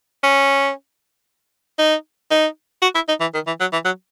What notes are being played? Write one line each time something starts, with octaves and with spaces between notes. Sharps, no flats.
C#4
D#4
D#4
F#4
E4
D#4
E3
D#3
E3
F#3
E3
F#3